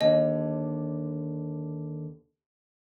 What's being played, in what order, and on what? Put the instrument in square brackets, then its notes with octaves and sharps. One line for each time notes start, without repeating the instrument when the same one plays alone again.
[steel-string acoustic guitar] D#2 D3 [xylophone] D#5